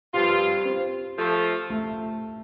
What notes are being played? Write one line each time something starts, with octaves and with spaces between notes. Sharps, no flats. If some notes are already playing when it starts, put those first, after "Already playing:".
G2 F3 C4 F4 G4
G4
C4
F3 A3 F4
A3